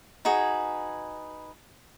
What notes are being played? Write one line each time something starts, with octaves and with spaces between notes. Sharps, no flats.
D#4 F#4 G#4 B4